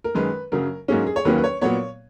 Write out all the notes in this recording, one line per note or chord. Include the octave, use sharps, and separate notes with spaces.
A#4
F#2 D#3 G#3 B4
F#2 C#3 F#3 A#4
G#2 F#3 A#3 C#4 G#4
G#4
C#5
D#2 D#3 F#3 A#3 C#4 B4
B4
C#5
A#2 F#3 B3 C#5